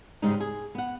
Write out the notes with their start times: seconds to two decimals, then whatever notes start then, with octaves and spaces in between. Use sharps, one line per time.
0.22 G#2 C#3 G3 G#3 D#4
0.40 G#4
0.75 B3 F#5